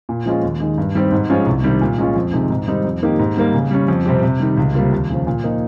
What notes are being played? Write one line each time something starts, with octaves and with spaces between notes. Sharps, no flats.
A#2
F3 G#3 C#4 F4
D#2
D#3 G#3
G2
D#3 G3 C4 G4
G#2
F3 G#3 C#4 F4
C2
C3 D#3 G3
A#2
G#3 C#4 F4
F2
C3 D#3 G#3 D#4
G#2
D#3 G3 C4 D#4
F2
D#3 A#3 D#4 G4
G#2
D#3 G3 A#3
C#3
G3 C#4
F2
C3 G3 C4 G4
C3
D#3 G3
C#2
C3 G3 A#3 F4
D#2
C#3 F3
A#2
F3 A#3 D#4